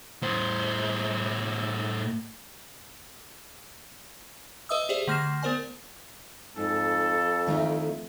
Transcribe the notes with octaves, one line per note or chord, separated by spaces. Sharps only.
A2 C5
B4 D#5 E5 D#6 E6
G4 G#4 C5 D5 E5
D3 A3 F6 A#6 C7 E7
B3 A#4 C5 D5 G#5
F2 G#2 A4
D#3 A3 D#4 E4 A#4 E5